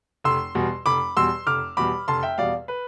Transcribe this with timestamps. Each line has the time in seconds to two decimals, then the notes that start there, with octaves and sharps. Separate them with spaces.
0.24 F1 C6 E6
0.55 E2 B2 G3
0.86 F1 B5 D6
1.17 E2 B2 G3 C6 E6
1.46 F1 D6 F6
1.77 E2 B2 G3 B5 D6
2.08 F1 A5 C6
2.23 E5 G5
2.38 E2 B2 G3 D5 F5
2.68 B4